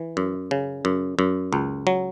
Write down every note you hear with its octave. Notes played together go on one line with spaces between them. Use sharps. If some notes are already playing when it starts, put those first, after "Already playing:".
Already playing: E3
F#2
C#3
F#2
F#2
C#2
F#3